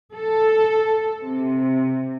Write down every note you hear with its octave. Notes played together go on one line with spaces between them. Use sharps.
A4
C3